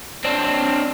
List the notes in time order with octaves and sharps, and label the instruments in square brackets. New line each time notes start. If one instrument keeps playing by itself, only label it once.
[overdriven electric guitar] C4 D4